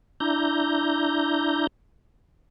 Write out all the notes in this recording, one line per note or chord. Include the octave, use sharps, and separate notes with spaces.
D4 E4 A#5 G6